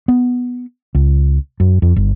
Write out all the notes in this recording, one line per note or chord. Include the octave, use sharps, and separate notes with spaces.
B3
C#2
F#2
F2
G1